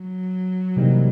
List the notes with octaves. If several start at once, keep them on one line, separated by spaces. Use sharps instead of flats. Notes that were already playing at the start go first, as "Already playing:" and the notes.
Already playing: F#3
C3 E3 G3 A#3 D#4